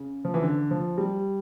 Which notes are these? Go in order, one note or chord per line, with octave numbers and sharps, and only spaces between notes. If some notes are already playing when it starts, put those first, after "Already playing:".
Already playing: C#3
F3
E3
D3
F3
G3